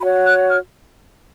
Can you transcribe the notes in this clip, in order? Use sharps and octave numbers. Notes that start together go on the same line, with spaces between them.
F#4 C#5 B5
F#6
F6